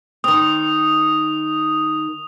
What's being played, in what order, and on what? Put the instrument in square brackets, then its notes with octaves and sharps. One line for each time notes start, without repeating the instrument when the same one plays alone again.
[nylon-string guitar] D#3 C4 [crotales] D#6